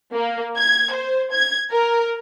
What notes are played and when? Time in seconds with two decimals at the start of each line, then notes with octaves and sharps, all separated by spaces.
0.13 A#3
0.59 G#6
0.93 C5
1.33 G#6
1.71 A#4